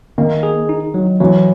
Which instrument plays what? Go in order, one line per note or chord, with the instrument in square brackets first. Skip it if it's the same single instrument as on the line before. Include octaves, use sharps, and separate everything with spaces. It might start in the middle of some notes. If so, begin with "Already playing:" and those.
[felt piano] D#3 [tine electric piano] A#3
[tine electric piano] G#4
D#4
F#3
[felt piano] E3 [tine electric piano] F#3